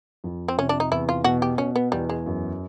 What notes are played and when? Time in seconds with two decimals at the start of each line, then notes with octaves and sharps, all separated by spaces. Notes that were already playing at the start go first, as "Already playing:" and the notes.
0.24 F2
0.48 C4
0.58 C3 C#4
0.69 D4
0.80 D#4
0.91 E2 E4
1.09 F4
1.24 B2 F#4
1.42 G4
1.58 B2 C#4
1.76 B3
1.92 E2 G3
2.09 G#3
2.26 F#2